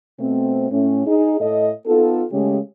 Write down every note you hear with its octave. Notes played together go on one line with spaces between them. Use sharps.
B2 A3 C4
A2 A3 C#4
D#4 G#4
A2 A4 D#5
B3 D#4 F4 A4
C#3 G#3 A3 C#4 G4